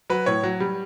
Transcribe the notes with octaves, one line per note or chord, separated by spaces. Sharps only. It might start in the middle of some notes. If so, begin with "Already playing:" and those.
F#3 B4
A2 C#5
F#3
G3